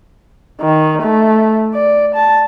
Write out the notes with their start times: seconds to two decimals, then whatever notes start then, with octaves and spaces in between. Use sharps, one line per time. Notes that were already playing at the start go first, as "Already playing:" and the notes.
0.61 D#3
1.02 A3
1.74 D5
2.15 A5